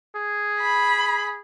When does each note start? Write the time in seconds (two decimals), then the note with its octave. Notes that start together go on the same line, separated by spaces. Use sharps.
0.16 G#4
0.60 B5